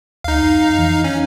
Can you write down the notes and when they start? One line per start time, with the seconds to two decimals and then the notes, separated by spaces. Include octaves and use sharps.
0.24 D2 D#4 F5
0.43 F2
0.78 E3
1.04 C#4